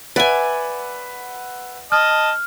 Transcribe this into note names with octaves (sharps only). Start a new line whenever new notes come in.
B4 D5 E5 F#5 G#5
D#5 A5 F6